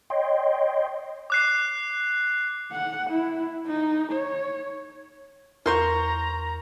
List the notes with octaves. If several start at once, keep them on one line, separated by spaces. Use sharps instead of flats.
C#5 D#5 G5 C6
D6 F#6 C7
F#5
E4
D#4
C#5
E2 A#4 C5 A#5 C6 C#6 G6